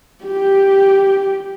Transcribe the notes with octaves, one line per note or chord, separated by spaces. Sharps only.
G4